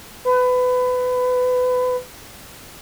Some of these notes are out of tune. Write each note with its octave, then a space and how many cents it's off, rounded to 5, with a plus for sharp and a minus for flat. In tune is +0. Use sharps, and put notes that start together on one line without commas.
B4 +25